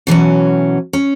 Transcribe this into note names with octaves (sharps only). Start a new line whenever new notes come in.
B2 E3 F#3 C#4
C#4